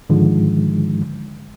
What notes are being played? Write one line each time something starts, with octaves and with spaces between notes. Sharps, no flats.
G#2 D3 D#3 F3 G#3